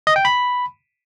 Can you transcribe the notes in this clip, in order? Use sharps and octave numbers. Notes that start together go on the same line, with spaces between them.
D#5
G5
B5